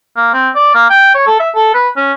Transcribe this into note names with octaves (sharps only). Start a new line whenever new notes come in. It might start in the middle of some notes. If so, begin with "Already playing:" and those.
A#3
C4
D5
A#3
G5
C#5
A4
E5
A4
B4
C#4